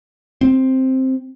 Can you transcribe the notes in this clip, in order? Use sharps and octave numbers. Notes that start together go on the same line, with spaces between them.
C4